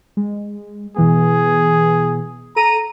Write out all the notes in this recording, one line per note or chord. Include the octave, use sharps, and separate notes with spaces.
G#3
B2 E3 B3 G#4
A4 A#5 D#7